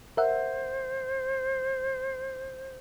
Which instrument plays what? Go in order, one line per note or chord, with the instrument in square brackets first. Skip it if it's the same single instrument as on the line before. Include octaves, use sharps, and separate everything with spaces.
[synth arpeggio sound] A#4 E5 F#5 [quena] C5